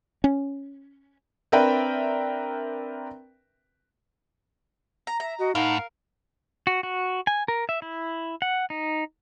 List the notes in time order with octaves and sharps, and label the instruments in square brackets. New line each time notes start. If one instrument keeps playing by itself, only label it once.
[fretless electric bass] C#4
[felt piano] C4 D4 A#4 B4 E5 G5
[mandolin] A#5
[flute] E5 [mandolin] A#5
[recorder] F#4 [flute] D#5
[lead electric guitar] A2 [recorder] D#4 [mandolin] A#4 F5 [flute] F#5
[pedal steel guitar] F#4
F#4
G#5
A#4
E5
E4
F#5
D#4